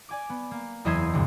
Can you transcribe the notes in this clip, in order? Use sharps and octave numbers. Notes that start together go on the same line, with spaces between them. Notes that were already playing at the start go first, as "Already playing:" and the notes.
D5 G#5 D6
B3
A#3
F#1 E2 D#5 E5 C6 G#6
D2 G2 C3